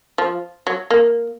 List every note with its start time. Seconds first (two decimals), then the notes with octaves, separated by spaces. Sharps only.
0.18 F3
0.67 F#3
0.90 A#3